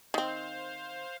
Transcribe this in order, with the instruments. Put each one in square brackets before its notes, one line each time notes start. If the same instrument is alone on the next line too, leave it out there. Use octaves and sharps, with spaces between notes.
[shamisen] D#3 C4 [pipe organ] C5 F5